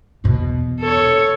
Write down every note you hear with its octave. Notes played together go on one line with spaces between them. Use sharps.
E2 B2
A4 C#5